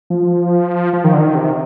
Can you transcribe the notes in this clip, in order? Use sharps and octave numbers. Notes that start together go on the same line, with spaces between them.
F3
F3
D#3
D3
D#3
C3